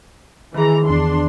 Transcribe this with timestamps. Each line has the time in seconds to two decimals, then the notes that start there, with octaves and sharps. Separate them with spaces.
0.55 D#3 E3 G#4 A#5
0.86 E2 D4 C6